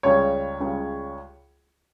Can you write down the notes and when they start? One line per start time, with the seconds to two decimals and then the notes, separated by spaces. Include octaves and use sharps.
0.03 C#2 C#3 G3 C#5
0.60 C#2 C#3 G3